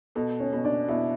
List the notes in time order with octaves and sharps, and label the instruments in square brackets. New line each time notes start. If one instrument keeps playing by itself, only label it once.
[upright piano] B2 [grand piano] A4
[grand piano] C#4 C#5
[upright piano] B2
[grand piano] D4 D5
[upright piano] B2 [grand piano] E4 E5